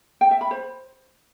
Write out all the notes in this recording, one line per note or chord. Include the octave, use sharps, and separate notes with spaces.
G5
E5
B5
C5